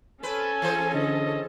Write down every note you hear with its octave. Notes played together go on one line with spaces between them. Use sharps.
C4 C#4 A4 B4 G#5
E3 G#4 C5
D3 D#5